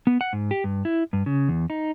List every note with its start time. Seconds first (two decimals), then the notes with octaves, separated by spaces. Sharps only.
0.07 B3
0.21 F#5
0.33 G#2
0.51 G4
0.64 G2
0.85 E4
1.13 G2
1.26 C#3
1.49 E2
1.70 D#4